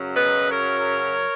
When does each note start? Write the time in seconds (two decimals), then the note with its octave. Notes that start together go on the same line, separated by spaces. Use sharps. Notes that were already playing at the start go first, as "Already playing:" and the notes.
Already playing: F#2 C#3 F#3
0.15 B4 D#5
0.51 A#4 C#5